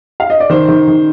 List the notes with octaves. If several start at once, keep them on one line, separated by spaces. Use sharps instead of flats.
F5
D#5
D5
D#3 C5
D#3
D#3